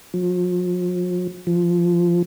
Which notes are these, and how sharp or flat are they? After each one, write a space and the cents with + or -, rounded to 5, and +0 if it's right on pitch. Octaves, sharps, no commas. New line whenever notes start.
F3 +45
F3 -10